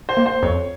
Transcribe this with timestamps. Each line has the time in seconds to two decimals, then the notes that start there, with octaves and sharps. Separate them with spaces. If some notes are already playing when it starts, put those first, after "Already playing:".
0.09 C5
0.17 A#3
0.26 C5
0.43 F2 C#5